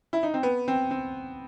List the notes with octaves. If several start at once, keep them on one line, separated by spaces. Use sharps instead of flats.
E4
D#4
C4
B3
C4
C4